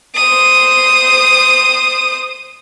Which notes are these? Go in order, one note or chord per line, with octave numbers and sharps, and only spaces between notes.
C5 D#6